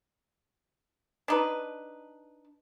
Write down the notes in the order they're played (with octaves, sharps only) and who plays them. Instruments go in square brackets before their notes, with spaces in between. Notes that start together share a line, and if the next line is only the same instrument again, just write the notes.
[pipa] D4 D#4 B4